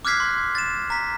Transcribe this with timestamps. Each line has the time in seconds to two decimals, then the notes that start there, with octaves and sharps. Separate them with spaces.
0.05 D6 F6 F#6 G#6 B6 C7
0.20 C6
0.55 A6 E7
0.90 A#5 B6